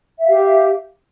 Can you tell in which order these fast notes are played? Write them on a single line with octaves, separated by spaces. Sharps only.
E5 F5 G4